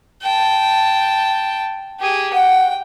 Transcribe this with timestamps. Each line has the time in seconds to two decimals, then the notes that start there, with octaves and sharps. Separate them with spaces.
0.22 G5 A5
2.00 G4 G#4
2.34 F#5 G5